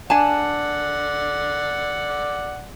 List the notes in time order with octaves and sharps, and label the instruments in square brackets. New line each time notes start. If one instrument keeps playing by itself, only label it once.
[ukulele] D4 G#5 A5 [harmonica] D5 F#5